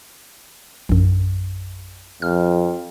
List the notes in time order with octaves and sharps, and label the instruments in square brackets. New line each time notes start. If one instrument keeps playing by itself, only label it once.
[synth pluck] A#1 F#2
[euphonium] F2 [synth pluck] F6